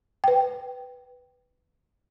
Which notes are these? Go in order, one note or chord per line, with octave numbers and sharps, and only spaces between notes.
B4 G5